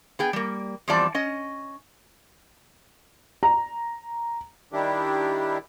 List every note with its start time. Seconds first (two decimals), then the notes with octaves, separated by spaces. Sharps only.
0.19 B3 G#4 G5
0.33 G3 A#3
0.88 E2 F3 G3 C4 D5 A5
1.15 C#4 D#5
3.43 A#5
4.73 D#3 G3 D4 E4 G4